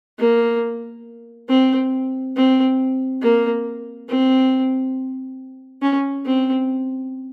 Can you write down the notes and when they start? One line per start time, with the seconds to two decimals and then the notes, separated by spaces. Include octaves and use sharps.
0.19 A#3
1.49 C4
2.36 C4
3.22 A#3
4.09 C4
5.82 C#4
6.25 C4